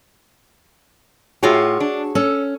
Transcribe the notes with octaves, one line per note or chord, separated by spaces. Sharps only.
A2 F4 F#4 G#4 C#5 G5
D4
C#4 A4